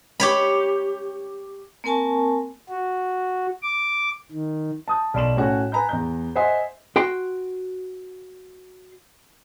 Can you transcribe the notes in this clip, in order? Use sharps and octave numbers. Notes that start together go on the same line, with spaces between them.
G4 C#5 B5
A#3 C4 A#4 G#5 A5 C#6
F#4
D6
D#3
A5 D#6 G6
B1 D5 C6 E7 F#7
A2 C#4 F#4
B4 G#5 A#5 B5 G6
E2 A#5 G6
C5 D#5 E5 F#5 G#5 C6
F#4 G5 C6